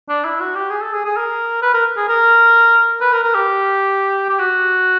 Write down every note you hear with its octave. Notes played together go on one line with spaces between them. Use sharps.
D4
E4
F#4
G4
G#4
A4
G#4
G#4
A#4
B4
A#4
G#4
A#4
B4
A#4
A#4
G4
G4
F#4